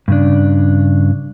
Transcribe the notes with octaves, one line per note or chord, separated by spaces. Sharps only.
G2 C#3 D4